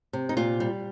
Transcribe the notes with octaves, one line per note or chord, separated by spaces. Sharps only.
C3
D#4
A#2 F4
G3